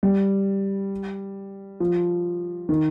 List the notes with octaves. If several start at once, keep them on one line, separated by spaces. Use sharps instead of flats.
G3
F3
D#3